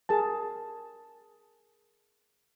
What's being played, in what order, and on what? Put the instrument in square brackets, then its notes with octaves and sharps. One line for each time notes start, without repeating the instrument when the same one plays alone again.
[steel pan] G#4 A#4 A5